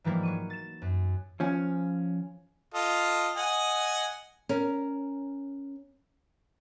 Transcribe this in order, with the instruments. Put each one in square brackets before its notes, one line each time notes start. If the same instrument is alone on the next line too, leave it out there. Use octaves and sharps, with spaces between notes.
[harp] G#2 E3 F3 G3 A#3 E4
F#3 C#6 D#7
A6 E7
F#2
[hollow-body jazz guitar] F3 C#4
[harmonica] F4 A4 D#5
D#5 F#5 G#5
[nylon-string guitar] C#4 A#4